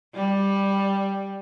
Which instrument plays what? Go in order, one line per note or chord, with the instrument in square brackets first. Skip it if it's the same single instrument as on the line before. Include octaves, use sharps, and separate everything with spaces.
[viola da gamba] G3